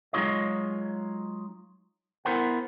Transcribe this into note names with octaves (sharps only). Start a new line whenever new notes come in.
F#3 G#3 D#4 F4 C#5 D#5
B3 E4 A#4 C5 F#5